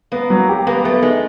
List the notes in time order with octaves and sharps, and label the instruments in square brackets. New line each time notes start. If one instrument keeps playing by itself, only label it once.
[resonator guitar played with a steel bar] A#3 [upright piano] B3
[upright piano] F#3
G4
[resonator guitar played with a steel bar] A#3 [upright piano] B3
[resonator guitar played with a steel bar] A3 [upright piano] B3
[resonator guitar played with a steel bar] G#3 [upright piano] D#4